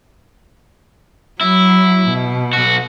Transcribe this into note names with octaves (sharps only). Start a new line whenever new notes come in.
F#3 E4
B2
B1 F#4